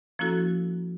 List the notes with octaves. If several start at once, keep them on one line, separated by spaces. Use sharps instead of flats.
F3 A#3 C#4 E4 F#4 A4